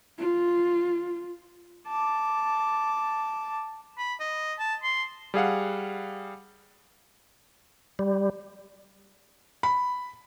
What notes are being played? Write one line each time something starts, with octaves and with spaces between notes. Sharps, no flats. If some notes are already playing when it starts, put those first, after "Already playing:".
F4
A5 D6
B5
D#5
A5
C6
G3 G#4 F5 F#5
G3
B5